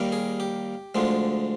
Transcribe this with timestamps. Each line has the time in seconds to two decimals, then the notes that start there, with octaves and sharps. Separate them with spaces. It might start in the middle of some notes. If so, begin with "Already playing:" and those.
Already playing: D#2 D#3 G3 A#3
0.12 G#4
0.40 G4
0.95 D2 D3 F3 G#3